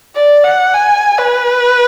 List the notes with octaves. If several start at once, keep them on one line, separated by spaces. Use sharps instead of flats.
D5
F#5
G#5
B4